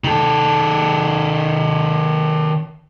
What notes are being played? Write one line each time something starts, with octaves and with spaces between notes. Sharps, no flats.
D#3 A4